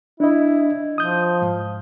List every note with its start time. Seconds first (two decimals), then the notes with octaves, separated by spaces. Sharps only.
0.20 D4 E4 D#5
0.98 F3 D#6 G6
1.42 G#2